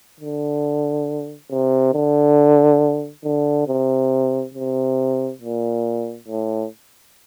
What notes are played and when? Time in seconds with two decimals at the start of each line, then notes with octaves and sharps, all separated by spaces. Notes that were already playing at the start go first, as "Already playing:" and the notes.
0.20 D3
1.51 C3
1.94 D3
3.24 D3
3.68 C3
4.54 C3
5.41 A#2
6.28 A2